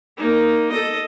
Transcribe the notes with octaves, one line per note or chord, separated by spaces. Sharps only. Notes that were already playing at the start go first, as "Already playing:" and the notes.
A#3 D#4
A4 D#5